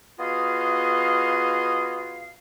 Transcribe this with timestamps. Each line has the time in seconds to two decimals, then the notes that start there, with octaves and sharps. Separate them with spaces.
0.18 B3 F4 F#4 G#4 D#5 F5